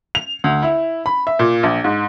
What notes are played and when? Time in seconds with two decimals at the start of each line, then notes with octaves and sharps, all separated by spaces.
0.15 F7
0.44 D2
0.63 E4
1.06 B5
1.27 E5
1.39 A#2
1.63 A#1
1.84 G#2